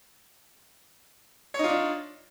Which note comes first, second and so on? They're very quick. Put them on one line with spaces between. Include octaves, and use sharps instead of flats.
C#5 D#4 F4 D4